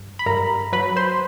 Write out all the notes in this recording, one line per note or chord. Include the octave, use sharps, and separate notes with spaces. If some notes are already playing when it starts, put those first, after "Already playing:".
Already playing: G2
B5
G2 A#4 A#5
F#3 B4 B5
C5 C6